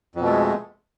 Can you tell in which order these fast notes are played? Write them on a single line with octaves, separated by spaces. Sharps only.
F2 B2 A3 G#3